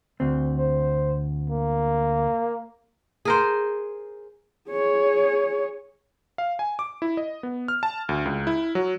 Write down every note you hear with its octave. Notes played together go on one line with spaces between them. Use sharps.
D2 C4
C5
A#3
G#4 A#4 C5
G#4 C#5
F5
G#5
D6
E4
D#5
B3
F6
A5
D2
C#2
E4
F#3